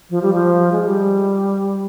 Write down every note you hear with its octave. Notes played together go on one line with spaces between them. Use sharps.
F3
G3
F3
G#3
G3